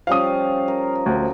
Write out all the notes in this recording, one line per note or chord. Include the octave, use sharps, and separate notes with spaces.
F3 G3 C#4 F5 D#6
A#4
D2